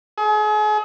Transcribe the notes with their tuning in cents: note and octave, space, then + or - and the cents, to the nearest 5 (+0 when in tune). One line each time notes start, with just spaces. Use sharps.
G#4 +35